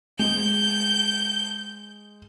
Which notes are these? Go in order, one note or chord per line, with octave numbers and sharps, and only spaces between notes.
G#3 G6